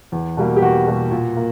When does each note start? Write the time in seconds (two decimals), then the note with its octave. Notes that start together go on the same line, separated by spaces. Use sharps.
0.12 E2
0.37 B2 G3 A#3
0.56 G4
0.62 E2 F#4
0.87 B2 G3 A#3
1.11 A#2
1.36 A#3